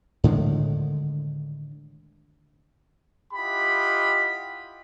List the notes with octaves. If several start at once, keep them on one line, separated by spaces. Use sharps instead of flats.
A2 D3 D#3 G#3
E4 F4 G4 D#5 F#5 B5